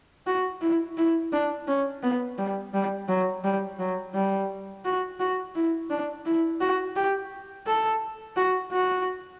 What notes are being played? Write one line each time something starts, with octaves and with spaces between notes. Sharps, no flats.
F#4
E4
E4
D4
C#4
B3
G3
G3
F#3
G3
F#3
G3
F#4
F#4
E4
D4
E4
F#4
G4
A4
F#4
F#4